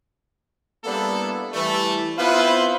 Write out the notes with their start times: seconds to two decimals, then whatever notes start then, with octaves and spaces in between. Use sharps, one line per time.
0.84 G3 A#3 B3 D4 E4 A4
1.53 E3 G3 A3
2.18 B3 C4 E4 F4 B4 C5